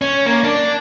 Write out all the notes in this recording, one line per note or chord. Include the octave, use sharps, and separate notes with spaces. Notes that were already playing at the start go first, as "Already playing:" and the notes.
C#4
A#3
D4